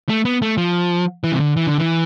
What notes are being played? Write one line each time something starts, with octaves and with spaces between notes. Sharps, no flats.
A3
B3
A3
F3
E3
C3
D3
E3
D3
E3